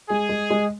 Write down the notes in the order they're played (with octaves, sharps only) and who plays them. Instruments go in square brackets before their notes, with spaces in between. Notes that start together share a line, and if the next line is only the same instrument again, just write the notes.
[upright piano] G#3 [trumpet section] G#4
[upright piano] G#3
G#3